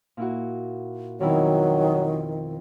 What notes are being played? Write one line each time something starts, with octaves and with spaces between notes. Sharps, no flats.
A#2 E4 F#4
F2 B2 D#3 F#3 E4